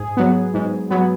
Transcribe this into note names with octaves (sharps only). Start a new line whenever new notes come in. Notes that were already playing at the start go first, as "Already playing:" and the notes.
Already playing: G#2 G#4
F#3 B3
G#2
F#3 B3